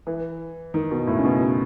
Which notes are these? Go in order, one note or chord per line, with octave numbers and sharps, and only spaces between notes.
E3
D#3
B2
A2
C#3
B2